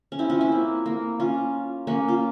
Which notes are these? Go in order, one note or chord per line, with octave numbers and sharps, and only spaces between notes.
C#4
C4 E4
C#4 F4
C4 E4
A#3
A#3
C#4 F4
A#3 C#4
F4